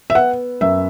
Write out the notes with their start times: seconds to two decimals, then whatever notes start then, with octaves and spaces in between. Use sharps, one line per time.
0.10 E5
0.15 B3 F#5
0.61 F#2 E5